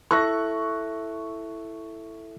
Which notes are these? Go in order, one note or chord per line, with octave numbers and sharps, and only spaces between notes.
E4 A4 E5 C#6 F#6 A#6